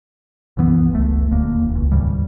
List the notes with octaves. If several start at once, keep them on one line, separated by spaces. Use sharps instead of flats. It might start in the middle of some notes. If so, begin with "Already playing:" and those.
C2 F#2 E3 B3
F#1 C#2 A3
D#1 D2 A#3
E1
C#2
D#2 G#2 C#3 G3